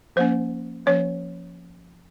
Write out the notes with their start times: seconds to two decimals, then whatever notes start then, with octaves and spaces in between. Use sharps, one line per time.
0.16 F3 A#3 C#4 C5
0.86 F3 A#3 C#4 C#5